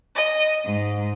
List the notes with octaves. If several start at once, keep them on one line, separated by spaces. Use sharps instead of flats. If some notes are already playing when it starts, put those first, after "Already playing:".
D#5
G#2